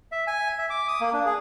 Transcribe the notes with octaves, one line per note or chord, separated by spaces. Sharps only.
E5
G#5
E5
D6
D#6
A#3
D4
G#4